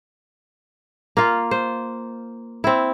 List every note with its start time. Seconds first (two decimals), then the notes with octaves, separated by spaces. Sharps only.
1.17 A#3 F4
1.51 C5
2.64 C4 E4